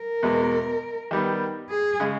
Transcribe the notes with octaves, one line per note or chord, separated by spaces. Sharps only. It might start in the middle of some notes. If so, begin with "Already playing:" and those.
Already playing: A#4
E2 B2 G#3
D#3 G3 B3
G#4
C#3 G#3